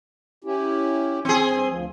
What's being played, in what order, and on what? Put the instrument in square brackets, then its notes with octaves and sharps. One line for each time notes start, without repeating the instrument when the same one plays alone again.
[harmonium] C#4 E4 G4
[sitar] C4 G#4
[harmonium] G2
D2 F3